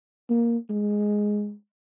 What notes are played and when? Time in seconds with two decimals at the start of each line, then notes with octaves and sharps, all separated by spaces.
0.30 A#3
0.70 G#3